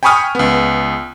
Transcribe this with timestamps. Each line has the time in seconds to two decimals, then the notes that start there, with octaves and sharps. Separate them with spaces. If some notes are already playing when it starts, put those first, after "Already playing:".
0.03 G5 G#5 B5 C#6 D#6 F6
0.35 C#2 B3